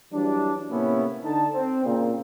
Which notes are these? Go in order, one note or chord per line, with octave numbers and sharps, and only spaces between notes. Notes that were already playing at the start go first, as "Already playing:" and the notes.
E3 F#3 G3 D4
A2 C3 A#3 B3 C#4 E4
D3 D#4 A5
C4
A#2 C#3 C4